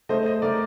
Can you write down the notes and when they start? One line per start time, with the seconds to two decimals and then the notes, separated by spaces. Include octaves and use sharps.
0.09 A3 C5 D#5
0.26 C5 D#5
0.42 A3 A#4 D5